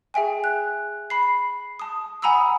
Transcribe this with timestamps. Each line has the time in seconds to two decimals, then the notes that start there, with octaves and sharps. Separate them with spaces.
0.14 G#4 E5 G5 G#5
0.44 F#6
1.10 B5 C7
1.80 A5 D#6
2.22 F#5 G#5 A#5 B5 D#6 E6